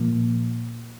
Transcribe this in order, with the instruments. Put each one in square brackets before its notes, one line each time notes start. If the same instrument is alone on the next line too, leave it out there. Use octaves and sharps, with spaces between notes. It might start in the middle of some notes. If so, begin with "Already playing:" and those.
Already playing: [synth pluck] A#2 F3 A#3